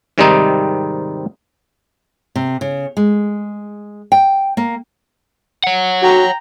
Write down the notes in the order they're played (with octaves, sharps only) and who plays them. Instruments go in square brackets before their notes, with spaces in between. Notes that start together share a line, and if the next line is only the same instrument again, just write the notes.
[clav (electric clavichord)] G#2 C3 D#3 G3 C4 D#4
[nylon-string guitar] C3
C#3
G#3
G5
A#3
[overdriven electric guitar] C#5 F#5
[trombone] F#4 [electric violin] G5 A#5